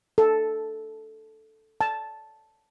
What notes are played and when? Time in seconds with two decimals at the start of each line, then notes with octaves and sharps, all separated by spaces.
0.18 A4
1.81 A5